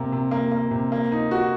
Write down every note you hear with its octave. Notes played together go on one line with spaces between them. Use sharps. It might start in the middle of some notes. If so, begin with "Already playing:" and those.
Already playing: C3 A#3
C3
A#3
A#3
C3
A#3
D#4
F#4